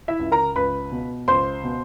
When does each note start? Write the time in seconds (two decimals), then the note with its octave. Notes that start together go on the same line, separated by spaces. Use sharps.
0.08 E4 E5
0.20 C#2
0.31 A#4 A#5
0.56 C#2 B4 B5
0.92 B2
1.28 C#2 C5 C6
1.64 B2